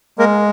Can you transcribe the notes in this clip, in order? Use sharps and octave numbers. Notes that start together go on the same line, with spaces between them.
G#3 A#3 A#4